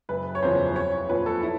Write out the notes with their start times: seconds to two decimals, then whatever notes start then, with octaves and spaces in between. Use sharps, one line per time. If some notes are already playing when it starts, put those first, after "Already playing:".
0.09 F#1 B4
0.35 C#5
0.42 E2 C#3 F3 C5
0.76 C2 C#5
0.93 C#5
1.09 A#2 F3 B4
1.26 A4
1.43 E4